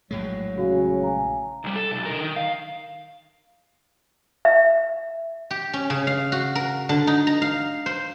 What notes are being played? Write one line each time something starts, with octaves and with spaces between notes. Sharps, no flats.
A#1 A2 F#3 G#3
C#3 F#4
G#5 A#5
B1 G3
A4
B1 G#2
D3 A#4
D#3
F5
E5
G4
C#4
C#3
F5
F#4
A#4
D3
D#4
A#5
F5
C5